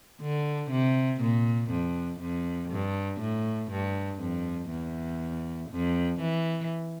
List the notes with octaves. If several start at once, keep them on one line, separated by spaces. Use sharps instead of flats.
D3
C3
A#2
F2
F2
G2
A2
G2
F2
E2
F2
E3